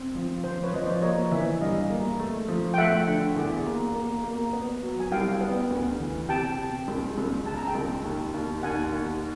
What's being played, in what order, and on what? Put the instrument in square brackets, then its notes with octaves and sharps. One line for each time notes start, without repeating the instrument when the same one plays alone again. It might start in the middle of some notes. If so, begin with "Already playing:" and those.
Already playing: [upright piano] C4
F3
[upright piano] F3 [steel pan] C5
[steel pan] B4 C#5
[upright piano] F3 [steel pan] D#5
[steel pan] C5 D5
[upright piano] A#3 [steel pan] C#5 D#5
[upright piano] E3 [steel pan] D5 E5
[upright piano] G2 [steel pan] D#5 F5
[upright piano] A#3
A3
F3
[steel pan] G5
[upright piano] A3 [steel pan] E5 F#5
[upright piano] D3
E2
A#3
A#3
A#3
B3
F#3
[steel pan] G#5
[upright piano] C2 [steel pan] F5 G5
[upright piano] B3
D2
E3
[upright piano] C3 [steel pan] G5 A5
[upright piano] C3
C#2
C#2
[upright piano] C#3 [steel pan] A5
[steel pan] A#5
G5 A5
[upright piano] C#2
D#2
D#2
[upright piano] D#2 [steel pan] F#5 G#5
[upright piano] D#2